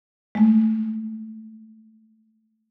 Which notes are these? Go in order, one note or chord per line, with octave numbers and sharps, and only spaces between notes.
G#3 A3